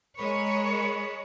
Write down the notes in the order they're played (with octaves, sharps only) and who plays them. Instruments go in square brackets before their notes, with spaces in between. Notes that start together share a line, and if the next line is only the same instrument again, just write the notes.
[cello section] G#3 C#5 [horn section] A#4 B5